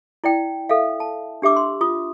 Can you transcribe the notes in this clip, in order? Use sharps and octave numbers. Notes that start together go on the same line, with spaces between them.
E4 D5 G5
A4 E5 F5
A5
D4 G4 E5 D6 E6
C6
F4 D#6